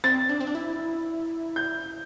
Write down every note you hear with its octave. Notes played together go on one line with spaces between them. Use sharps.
C4 A6
D4
C4
D4
E4
G6